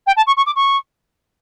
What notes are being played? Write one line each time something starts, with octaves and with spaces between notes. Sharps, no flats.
G5
A5
C#6
C#6
D6
C#6